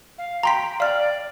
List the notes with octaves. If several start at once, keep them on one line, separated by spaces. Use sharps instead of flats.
F5
G5 A#5 C6 B6
D5 F5 F6